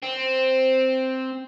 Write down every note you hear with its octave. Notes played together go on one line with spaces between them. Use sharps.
C4